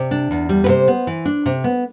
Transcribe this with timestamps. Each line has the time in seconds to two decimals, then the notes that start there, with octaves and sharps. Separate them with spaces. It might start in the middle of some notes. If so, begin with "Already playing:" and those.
Already playing: C3 D5
0.11 D4
0.31 E2
0.49 G3
0.64 B4
0.68 C3 C5
0.88 B3
1.07 E3
1.25 D4
1.46 C3
1.64 B3